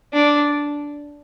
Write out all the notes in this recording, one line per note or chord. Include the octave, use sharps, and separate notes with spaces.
D4